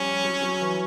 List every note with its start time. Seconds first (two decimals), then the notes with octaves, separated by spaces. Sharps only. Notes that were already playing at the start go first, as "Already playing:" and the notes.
Already playing: F3 G3 C#4
0.24 F#3
0.42 F#3
0.61 E3